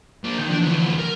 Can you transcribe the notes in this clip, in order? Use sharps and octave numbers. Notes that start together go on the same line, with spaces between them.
F3 A#3
D#3 G6
E3 F3 D4
D2 B3
A#4